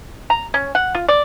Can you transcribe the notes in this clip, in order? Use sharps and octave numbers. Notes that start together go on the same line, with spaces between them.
A#5
C#4
F#5
F4
D5